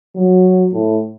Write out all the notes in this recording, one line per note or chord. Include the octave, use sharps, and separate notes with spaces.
F#3
A2